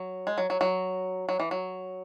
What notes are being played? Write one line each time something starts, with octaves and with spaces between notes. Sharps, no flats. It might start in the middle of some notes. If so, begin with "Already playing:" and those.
Already playing: F#3
G#3
F#3
F#3
F#3
F#3
E3
F#3